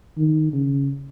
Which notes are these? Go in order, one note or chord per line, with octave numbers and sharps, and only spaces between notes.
D#3
C#3